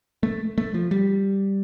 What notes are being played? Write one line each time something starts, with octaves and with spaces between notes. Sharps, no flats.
A3
A3
F3
G3